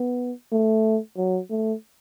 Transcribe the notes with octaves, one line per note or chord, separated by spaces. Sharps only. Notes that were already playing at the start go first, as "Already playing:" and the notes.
Already playing: B3
A3
F#3
A3